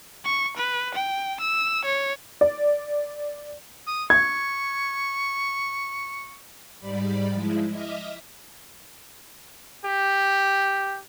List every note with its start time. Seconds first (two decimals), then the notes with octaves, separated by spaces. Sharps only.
0.25 C#6
0.57 B4
0.95 G5
1.41 E6
1.85 C#5
2.41 D5
3.87 D#6
4.10 C#6 G#6
6.79 G#2 G3 D5 B5
7.32 F3 G#3 E4
7.71 D#5 E5 D6 D#6 F6
9.85 G4